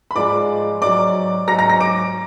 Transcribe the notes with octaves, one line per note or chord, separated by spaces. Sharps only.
B5
G#2 F3 G#3 D5 D6
G#2 F#3 D5 D6
G#2 F#3 A#5 A#6
A#5 A#6
A#5 A#6
D6 D7